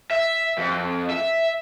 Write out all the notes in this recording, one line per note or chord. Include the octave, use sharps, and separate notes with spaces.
E5
F2
E5